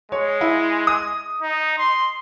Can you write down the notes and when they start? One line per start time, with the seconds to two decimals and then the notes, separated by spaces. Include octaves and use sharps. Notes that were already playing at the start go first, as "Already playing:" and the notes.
0.12 G#3 C#5
0.41 E4
0.87 D#6
1.42 D#4
1.79 C6